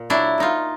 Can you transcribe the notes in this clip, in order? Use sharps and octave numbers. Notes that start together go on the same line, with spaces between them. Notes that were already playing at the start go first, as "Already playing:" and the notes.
Already playing: A#2
F#3 D4 E4
A#2 D#4 F4